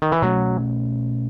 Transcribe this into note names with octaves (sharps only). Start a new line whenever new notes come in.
D#3
E3
B2 F#3 A3 C#4